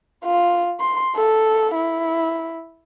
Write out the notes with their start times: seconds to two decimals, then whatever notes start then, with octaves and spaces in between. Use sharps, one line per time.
0.24 F4
0.80 C6
1.16 A4
1.75 E4